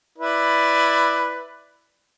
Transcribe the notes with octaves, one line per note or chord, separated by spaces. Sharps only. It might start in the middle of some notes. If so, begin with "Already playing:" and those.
E4 B4 D5